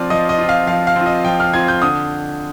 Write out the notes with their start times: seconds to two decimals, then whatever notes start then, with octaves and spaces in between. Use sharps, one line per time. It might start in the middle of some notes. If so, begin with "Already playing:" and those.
Already playing: F3 C4 F4 D5
0.10 F3 D#5
0.29 D#5
0.38 C4 F4
0.49 F5
0.67 F3 F5
0.87 F5
0.96 C4 F4
1.06 D#5
1.25 F3 G5
1.40 F6
1.53 C4 F4 G#6
1.68 G6
1.82 D3 D#6